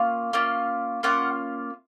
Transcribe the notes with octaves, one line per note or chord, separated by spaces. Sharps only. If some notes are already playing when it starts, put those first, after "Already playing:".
Already playing: A#3 C#4 F4 F5
A#3 C#4 F4
A#3 C#4 F4 F#5